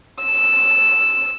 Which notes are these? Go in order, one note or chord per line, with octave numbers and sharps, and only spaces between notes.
E6